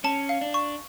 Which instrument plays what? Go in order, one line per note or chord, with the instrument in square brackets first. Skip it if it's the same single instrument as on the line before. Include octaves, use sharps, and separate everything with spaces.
[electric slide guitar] C#4 [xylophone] A5
[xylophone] F5
[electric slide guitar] D4
[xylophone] C#6